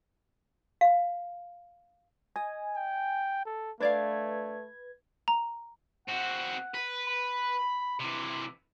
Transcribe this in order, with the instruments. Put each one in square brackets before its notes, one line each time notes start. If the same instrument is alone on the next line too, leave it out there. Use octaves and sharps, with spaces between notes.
[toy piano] F5
[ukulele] D#5 [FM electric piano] G#5
[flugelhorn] G5
A4
[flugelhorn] A3 [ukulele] D4 D5 F5 [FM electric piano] B4 G#6
[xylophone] A#5
[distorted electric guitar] C4 F#4 [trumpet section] F#5
[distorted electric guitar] B4
[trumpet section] B5
[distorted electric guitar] C3 E3 [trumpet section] C6 D6